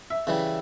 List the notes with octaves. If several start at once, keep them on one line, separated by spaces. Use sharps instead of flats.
E5
C#3 E3 G3